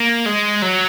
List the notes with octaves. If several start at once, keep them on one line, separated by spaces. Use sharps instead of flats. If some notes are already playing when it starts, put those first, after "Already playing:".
Already playing: A#3
G#3
F#3